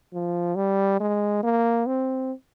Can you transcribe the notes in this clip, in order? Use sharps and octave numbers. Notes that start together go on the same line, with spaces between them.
F3
G3
G#3
A#3
C4